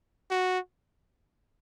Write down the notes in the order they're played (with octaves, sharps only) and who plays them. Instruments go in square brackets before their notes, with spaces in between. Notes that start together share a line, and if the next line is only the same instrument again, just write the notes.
[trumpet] F#4